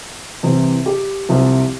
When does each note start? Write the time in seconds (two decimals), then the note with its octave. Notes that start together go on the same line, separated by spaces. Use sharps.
0.43 C2 C3 E3
0.86 G4
1.29 C2 C3 F3